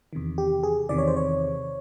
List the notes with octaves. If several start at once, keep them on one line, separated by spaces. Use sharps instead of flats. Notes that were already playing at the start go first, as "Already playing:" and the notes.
E2 C3 D#3
G4
G#4
E2 C3 D#3 D5
C#5
C5
C#5